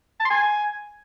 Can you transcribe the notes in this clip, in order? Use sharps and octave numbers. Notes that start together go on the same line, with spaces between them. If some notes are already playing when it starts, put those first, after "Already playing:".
A5
C6
G#5